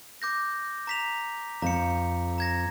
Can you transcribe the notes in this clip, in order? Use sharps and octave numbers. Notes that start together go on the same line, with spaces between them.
D6 G6 A#6
A#5 B6 F7
F2 A#5 C#7
A#5 G#6 A#6